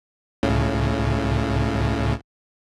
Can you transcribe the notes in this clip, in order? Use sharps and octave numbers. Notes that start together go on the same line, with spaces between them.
C#2 A2 C#3